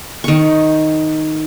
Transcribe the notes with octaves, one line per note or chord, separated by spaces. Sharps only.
D#3 C#6